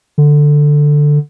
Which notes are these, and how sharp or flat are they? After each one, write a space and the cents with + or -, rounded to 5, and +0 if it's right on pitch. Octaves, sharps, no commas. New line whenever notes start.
D3 +5